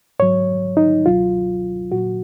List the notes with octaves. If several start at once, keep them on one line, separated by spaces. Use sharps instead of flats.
G#2 F#3 C#5
D#4
C#2 B2 F#3 F4
A#2 F#3 F#4